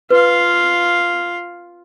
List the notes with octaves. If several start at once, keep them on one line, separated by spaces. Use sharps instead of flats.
F4 B4 F5